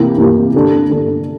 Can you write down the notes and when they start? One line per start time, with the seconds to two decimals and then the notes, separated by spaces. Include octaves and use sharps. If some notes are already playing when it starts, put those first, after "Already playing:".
Already playing: C3 E3 A#3 E4 G4
0.18 C3 E3 A#3 E4 G4
0.54 D3 A3 D4
0.90 D3 A3 D4